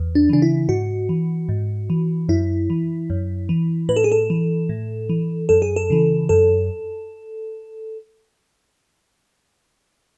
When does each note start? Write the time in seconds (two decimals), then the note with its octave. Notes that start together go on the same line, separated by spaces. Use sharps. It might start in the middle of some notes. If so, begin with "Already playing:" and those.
Already playing: E2
0.15 D4
0.29 C#3 E3 D4
0.42 E4
0.69 G#2 F#4
1.09 E3
1.49 G#2
1.90 E3
2.29 F#2 E4
2.70 E3
3.10 F#2
3.49 E3
3.89 A2 B4
3.96 A4
4.04 G#4
4.12 A4
4.30 E3
4.69 A2
5.09 E3
5.49 F#2 A4
5.62 G#4
5.76 A4
5.90 C#3 E3
6.29 F#2 A4